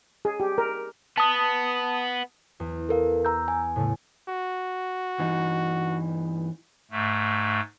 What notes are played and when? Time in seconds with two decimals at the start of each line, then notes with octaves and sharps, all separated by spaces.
0.25 G#4
0.40 G4
0.58 A#4
1.18 B3 A5 D#6
2.60 E2
2.89 A4 A#4 F5
3.25 A#5 E6 G6
3.48 G#5
3.76 A2 C#3 A3
4.29 F#4
5.19 G2 E3 D#4
6.91 G#2 A3